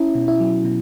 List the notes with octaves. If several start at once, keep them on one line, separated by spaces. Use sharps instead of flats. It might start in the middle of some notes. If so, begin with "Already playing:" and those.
Already playing: C#4 E4
B2
E4
F#3
B2